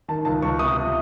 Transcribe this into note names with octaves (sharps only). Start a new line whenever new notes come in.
D#3 A5
C#2 A5
C#2 C#6
C3 D#6
C3